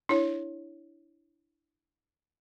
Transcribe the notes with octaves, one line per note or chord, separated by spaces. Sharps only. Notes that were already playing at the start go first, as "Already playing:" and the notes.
D4 E4 C#5